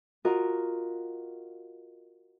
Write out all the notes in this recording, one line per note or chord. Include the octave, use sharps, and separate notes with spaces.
F4 F#4 A#4 D#5 F5